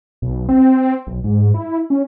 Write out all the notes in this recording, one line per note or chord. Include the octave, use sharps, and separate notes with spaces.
B1
C4
B1
G#2
E4
C#4